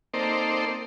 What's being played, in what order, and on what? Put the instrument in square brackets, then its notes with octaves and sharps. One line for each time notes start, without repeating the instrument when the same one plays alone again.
[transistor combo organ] A#3 C4 D#4 A4 C5 D5